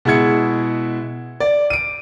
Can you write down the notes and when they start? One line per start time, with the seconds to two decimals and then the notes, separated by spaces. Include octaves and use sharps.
0.05 B2 G#3 E4 G#4 G#6 C#7
1.40 D5
1.70 D7 D#7